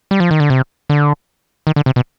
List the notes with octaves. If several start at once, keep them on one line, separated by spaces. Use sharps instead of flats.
G3
F3
D#3
D3
C3
D3
D#3
D3
C3
B2